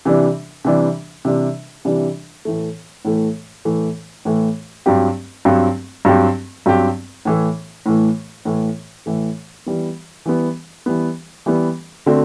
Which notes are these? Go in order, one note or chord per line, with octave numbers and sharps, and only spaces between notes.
C3 E3 G3 D4
C3 E3 G3 D4
C3 E3 G3 D4
C3 E3 G3 D4
A2 E3 A3
A2 E3 A3
A2 E3 A3
A2 E3 A3
G2 F#3 C4 G4
G2 F#3 C4 G4
G2 F#3 C4 G4
G2 F#3 C4 G4
A2 E3 A3
A2 E3 A3
A2 E3 A3
A2 E3 A3
E3 G3 B3
E3 G3 B3
E3 G3 B3
E3 G3 B3
D3 A3 C4 F#4